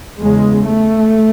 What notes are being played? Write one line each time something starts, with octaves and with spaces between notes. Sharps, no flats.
E2 C#3 G#3
A3